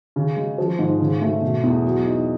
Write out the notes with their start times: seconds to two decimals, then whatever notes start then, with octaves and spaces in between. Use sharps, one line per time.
0.16 C#3
0.37 G#3
0.58 F3
0.79 G#2
1.01 C#3
1.22 A3
1.42 B2
1.63 E2
1.84 F#3
2.06 D#4